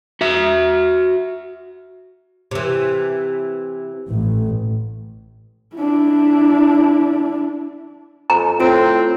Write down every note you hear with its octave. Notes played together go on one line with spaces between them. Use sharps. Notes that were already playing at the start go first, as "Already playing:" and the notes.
F#4 E5
C3 E3
A1
D4 E4
F2 A#5
A2 C4 F4 D7